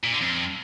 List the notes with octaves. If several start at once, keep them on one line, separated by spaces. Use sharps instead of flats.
A#2
D3
F2